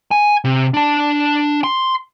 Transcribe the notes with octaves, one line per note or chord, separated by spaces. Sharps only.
G#5
C3
D4 A5
C6